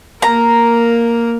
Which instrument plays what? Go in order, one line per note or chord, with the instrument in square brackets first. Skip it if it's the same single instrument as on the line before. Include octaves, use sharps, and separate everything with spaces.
[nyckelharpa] A#3 A#4 [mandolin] A#5